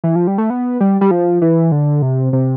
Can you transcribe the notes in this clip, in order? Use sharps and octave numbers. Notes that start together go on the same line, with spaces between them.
E3
F3
G3
A3
B3
G3
G3
F3
E3
D3
C3
C3